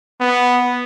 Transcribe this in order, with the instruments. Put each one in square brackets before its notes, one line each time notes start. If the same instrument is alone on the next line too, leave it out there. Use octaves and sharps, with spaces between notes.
[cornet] B3